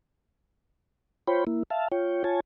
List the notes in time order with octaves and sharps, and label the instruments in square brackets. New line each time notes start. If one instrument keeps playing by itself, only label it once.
[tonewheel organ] F4 C5 C#5 G5 B5
A#3 E4
E5 F5 A5
F4 C#5 G5
F4 C#5 G#5 A5